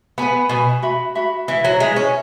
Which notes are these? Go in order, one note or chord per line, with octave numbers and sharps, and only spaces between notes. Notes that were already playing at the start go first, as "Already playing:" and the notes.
B3 B4 G#5 B5
B2 B4 G#5 B5
F#4 E5 B5
F#4 E5 B5
E3 E4 B4 E5
F#3
G#3 E4 B4 E5
C#4